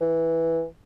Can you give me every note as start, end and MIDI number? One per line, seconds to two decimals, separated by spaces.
0.01 0.64 52